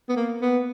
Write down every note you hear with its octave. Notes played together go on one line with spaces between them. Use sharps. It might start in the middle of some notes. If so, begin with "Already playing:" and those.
B3
A#3
B3